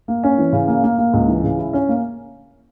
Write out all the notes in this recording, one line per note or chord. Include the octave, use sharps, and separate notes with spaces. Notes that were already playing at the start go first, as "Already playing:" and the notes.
A#3
C#4
E3
C#3
A#3
A#3
A#3
C#2
E3
C#3
E4
C#4
A#3